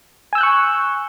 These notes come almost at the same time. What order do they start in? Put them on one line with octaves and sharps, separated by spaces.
G#5 E6 G6 F#6 C#6